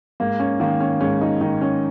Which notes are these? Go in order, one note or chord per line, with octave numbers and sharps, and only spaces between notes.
G#2 A#3
C#4
D#3 A#3
C#4
G#2 C#4
D#4
D#3 D#4
C#4